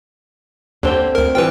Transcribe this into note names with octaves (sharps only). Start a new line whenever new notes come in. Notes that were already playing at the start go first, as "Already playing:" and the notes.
D#2 D3 C4 G5
D2 A#4
E3 G3 F4 B4 G5